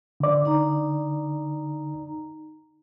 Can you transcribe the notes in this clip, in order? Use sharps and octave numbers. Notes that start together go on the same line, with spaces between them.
D3 D5
D#4 A#5